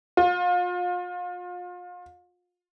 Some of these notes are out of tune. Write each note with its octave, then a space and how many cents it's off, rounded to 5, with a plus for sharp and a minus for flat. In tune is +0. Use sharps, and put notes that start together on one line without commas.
F4 +35